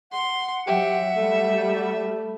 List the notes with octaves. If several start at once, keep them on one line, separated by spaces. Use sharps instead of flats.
F#5 C6
F#3 G4 E5
G3 A3